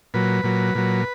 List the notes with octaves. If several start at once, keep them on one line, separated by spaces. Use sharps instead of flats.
A#2 F#3 B4
A#2 F#3
A#2 F#3